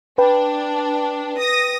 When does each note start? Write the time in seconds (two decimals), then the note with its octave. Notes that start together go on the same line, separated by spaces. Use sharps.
0.18 D4 B4 G5
1.38 D#6 A#6